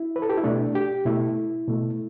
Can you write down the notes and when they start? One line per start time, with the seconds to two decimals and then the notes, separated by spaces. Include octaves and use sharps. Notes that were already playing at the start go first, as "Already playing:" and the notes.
Already playing: E4
0.16 B4
0.22 A4
0.29 G4
0.38 E4
0.44 B2 A3 D4
0.75 G4
1.05 B2 A3 E4
1.68 B2 A3